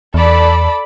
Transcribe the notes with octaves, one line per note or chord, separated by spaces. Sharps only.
E2 A4 D5 B5